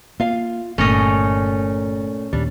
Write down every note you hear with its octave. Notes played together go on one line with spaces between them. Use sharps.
A#3 F4 F5
G1 A#2 A3 C#4 D#5
D#2 A#2 G3 D4